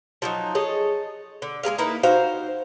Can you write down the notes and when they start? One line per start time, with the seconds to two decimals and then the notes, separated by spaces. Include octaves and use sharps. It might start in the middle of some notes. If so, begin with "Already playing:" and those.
0.22 F3 F#3 D#4
0.55 G#4 A4 C#5 D#5
1.42 D3
1.63 G#3 A#3 G#4 F5
1.78 A#3 D#4 E4 B4
2.03 D#4 F#4 C5 F5